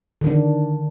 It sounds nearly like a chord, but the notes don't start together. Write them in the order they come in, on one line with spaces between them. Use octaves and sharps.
D3 D#3 D4